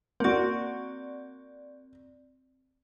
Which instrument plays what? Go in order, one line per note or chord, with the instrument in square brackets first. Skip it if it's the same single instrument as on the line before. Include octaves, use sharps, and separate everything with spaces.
[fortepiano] A#3 F#4 [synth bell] C4 D5